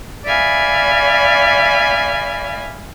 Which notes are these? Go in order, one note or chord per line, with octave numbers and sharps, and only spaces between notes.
D5 E5 F5 G#5 B5